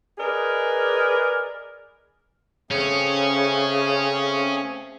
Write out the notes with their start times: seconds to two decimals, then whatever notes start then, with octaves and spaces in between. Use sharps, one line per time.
0.18 G#4 A#4 B4 D5 D#5
2.71 C#3 A3 C4 C#4 G#4